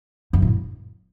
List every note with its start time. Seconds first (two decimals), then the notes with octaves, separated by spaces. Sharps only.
0.33 F#2
0.42 A2